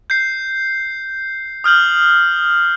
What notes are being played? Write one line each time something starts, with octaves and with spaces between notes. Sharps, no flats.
G6 C7
D#6 F6 G6 F#7